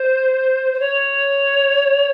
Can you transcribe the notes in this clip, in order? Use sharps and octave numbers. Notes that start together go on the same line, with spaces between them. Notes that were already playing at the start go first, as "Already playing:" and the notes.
Already playing: C5
C5
C#5